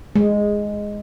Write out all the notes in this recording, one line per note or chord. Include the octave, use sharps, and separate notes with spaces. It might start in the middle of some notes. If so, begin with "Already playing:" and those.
G#3